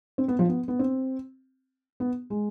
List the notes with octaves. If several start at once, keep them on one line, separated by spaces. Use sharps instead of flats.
C4
B3
F3
B3
B3
C4
B3
G#3